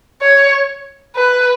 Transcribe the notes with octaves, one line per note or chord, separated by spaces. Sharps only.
C#5
B4